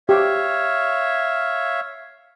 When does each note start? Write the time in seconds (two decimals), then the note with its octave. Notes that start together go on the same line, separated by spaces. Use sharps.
0.09 G4 C#5 E5 F5